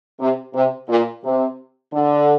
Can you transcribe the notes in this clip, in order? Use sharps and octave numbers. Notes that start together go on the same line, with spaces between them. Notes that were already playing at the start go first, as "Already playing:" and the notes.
C3
C3
A#2
C3
D3